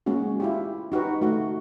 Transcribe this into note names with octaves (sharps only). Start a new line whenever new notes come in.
G#3 A#3 C#4 F#4
E4 F4 G4
D#4 F#4 G4 B4
A3 F#4